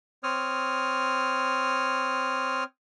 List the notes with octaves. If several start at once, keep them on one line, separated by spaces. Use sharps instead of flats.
C4 C#5 D#6 F6